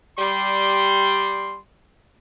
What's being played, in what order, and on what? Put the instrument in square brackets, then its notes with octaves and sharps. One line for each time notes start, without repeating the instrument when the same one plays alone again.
[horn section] G3 C6